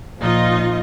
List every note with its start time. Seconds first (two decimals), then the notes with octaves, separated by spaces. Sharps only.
0.20 A#2 F3 D#4 F4 D#5